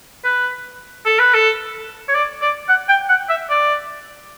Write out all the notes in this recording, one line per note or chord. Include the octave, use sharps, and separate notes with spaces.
B4
A4
B4
A4
C#5
D5
D5
F#5
G5
F#5
E5
D5